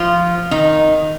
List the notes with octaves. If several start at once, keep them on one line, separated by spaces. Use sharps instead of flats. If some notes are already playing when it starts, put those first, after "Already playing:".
Already playing: F3 F4
D#3 D#4